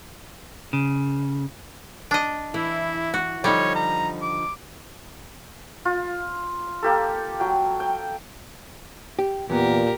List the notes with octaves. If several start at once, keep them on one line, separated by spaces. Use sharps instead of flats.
C#3
D4 D#5
E3 E4
F#4
D3 F3 G3 D#4 C#5
A#5
D6
F4
A#3 G4 A4
F#3 G5
G5
G4
E2 A#2 B3 G4 A#4